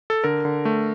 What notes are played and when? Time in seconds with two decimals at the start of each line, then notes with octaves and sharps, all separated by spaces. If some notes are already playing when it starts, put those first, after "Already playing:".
0.10 A4
0.24 D3 A#4
0.45 D3
0.65 A3